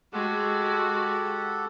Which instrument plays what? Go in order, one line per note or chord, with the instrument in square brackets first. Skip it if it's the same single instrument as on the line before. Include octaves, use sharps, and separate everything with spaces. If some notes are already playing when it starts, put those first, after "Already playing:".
[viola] G#3 F#4 [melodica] G4 A4 F#5